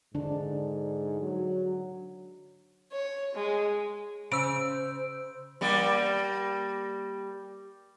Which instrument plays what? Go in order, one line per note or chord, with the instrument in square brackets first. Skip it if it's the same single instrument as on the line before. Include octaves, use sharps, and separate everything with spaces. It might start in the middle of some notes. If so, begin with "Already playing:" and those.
[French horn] G#2 [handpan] D3 D4
[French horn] F#3
[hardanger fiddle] C#5
G#3
[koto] C#3 [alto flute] C5 [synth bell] E6 D7
[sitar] G3 A#3 D5